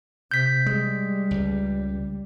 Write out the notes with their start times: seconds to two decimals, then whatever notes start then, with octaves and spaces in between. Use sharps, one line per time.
0.31 C3 G6 B6
0.66 G3 G#3
1.31 C#2